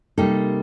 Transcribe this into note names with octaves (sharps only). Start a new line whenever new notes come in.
C3 G3 A#3 D#4 A4